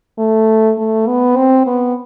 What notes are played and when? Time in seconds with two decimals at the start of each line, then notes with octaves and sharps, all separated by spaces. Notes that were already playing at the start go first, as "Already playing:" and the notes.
0.18 A3
0.78 A3
1.07 B3
1.36 C4
1.67 B3